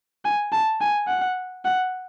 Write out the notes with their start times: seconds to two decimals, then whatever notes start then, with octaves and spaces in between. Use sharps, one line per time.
0.25 G#5
0.52 A5
0.81 G#5
1.08 F#5
1.65 F#5